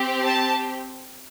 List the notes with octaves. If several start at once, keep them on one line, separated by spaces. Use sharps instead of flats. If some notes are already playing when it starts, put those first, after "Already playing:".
Already playing: C4 G4
A5